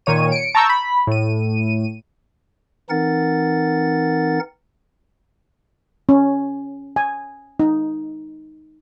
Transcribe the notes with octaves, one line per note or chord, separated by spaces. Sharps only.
A#2 D#3 C#5 D#7
C#7 D7
A5 A#5 C#6 E6 G6
B5
A2 D#7
E3 C4 D#4 A#4 F#5 A6
C#4
G#5
D#4